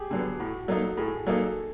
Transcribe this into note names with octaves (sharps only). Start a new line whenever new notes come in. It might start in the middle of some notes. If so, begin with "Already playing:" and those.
Already playing: G4 G#4
D3 F#3 B3
A2 F#4
F#3 A#3 D#4 A4
A2 G#4
F#3 A#3 D#4 A4